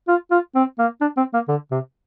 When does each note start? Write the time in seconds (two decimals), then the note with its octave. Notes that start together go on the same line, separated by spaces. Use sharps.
0.08 F4
0.31 F4
0.55 C4
0.79 A#3
1.01 D4
1.17 C4
1.33 A#3
1.48 D3
1.71 C3